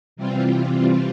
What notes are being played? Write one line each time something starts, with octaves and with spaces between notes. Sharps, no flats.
C3 E3 G3 C4 F4